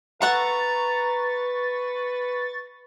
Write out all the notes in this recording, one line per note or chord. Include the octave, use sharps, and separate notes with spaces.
A4 B4 F#5 A5 A#5 C#6 A6